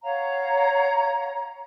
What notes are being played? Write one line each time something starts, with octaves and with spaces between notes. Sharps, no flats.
C#5 F5 F#5 A#5